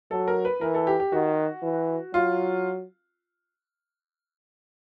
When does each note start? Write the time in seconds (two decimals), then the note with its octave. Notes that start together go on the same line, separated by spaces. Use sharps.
0.11 F#3 A4
0.28 A#4
0.45 B4
0.61 E3 A#4
0.75 A4
0.87 G4
1.00 G4
1.12 D#3 F#4
1.63 E3
2.13 F#3 F4